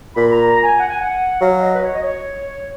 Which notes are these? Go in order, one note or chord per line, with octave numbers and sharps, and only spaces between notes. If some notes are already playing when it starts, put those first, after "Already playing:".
A#2 B5
A#5
A#5
G#5
F#5
G#5
F#5
F#3 F5
D#5
B4
C#5
D#5
C#5